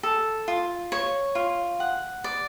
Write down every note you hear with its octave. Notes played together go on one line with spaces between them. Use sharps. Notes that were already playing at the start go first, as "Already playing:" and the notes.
A4
F4
C#5
F4
F#5
D5